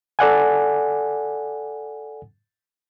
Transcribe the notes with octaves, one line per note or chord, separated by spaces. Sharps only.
A4 D5 F#5 G#5